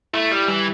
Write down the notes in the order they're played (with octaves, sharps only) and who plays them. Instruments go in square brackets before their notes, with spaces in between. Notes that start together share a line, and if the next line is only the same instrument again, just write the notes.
[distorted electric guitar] A3 [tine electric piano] E4
[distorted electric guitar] G3 [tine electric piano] G4
[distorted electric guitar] E3 [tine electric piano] G3